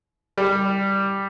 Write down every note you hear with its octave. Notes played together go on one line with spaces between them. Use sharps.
G3